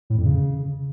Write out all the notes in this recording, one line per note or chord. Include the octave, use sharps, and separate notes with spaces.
A2
F2
C#3